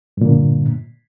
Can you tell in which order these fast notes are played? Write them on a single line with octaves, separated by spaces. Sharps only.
G2 A#2 D3